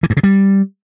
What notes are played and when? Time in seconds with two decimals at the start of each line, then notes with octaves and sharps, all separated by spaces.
0.03 E3
0.10 G2
0.17 C#3
0.23 G3